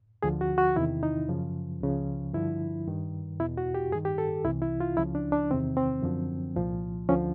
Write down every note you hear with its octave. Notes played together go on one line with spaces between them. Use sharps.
D2 D3 F3 G#4
F#4
F#4
E2 C3 D#3 E4
D#4
F#2 C#3 F3
C#2 C#3 F3
G2 D3 F3 E4
G2 D#3
E2 B2 E4
F#4
G4
G2 D#3 G#4
G4
A4
C2 C3 E3 E4
E4
F4
C#2 C#3 F3 E4
D4
D4
E2 C3 D#3 C4
C4
F#2 D3 F3
C2 A#2 F3
D2 D3 F3 C#4